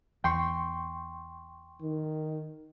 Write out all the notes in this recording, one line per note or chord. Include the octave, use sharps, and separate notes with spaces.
E2 G5 C6 C#6
D#3